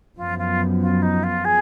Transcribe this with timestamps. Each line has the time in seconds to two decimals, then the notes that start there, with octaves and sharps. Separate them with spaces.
0.16 F#2 F3 B3 F4
0.38 F4
0.81 F4
1.02 D#4
1.23 F4
1.45 G#4